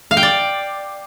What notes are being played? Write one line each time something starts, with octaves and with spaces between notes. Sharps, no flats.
F5
G5
D5